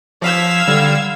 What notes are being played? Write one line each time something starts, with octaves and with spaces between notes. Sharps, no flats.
F3 F5 E6 G#6 B6
D3 G3